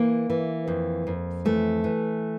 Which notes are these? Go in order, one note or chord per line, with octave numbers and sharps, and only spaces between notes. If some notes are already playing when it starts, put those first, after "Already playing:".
Already playing: E3 A#3
E3
F2
F2
E3 A3
E3